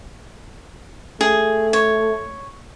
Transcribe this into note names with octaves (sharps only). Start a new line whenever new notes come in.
A3 G#4
C#5